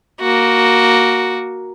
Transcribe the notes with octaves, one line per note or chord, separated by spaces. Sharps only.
A#3 F#4